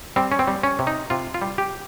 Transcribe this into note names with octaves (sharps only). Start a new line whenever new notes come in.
G3 C4
C#4
C4
G3
C#4
C3
D#4
C3 F4
F4
G3
G4